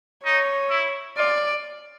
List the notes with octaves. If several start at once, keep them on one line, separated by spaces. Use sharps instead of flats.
D#4 C#5
E4
F4 D5